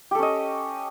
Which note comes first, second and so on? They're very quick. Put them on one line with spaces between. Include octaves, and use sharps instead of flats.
G4 A4 C#4 D#5